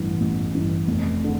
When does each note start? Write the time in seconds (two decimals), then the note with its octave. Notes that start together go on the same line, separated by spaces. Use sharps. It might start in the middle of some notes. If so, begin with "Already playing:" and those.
Already playing: A1 G2 E3
0.20 A1
0.55 G2 E3
0.88 F1
1.24 D3